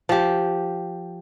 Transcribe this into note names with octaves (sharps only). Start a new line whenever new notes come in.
F3 G4